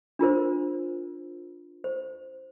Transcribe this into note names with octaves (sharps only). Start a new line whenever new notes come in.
D4 F4 A#4 C5
C5